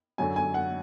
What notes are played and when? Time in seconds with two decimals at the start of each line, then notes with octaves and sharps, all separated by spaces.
0.18 F#2 D3 F#3 G#5
0.36 G#5
0.54 F#5